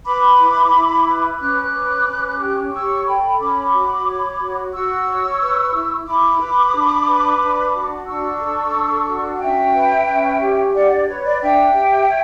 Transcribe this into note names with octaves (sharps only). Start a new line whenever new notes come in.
B4 B5 D6
E4
E4
B4
C#4 D6 F#6
B4
C#4
G4
C#5 C#6 E6
A4 G5 B5
C#4 B5 D6
F#4
C#5
F#4
F#4 C#6 E6
C#5
B4
E4
E4 B5 D6
B4
D4
B4
D4
F#4
D4 C#6 E6
A4
D4
F#4
F#5
C#4 E5 G5
B4
C#4
G4
D4 D5 F#5
D5
B4 C#5
D5
D4 E5 G5
G4
C#5